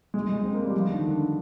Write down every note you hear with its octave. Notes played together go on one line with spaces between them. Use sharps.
G#3
G#3
C4
A#3
G3
F3
D3
D#3
D3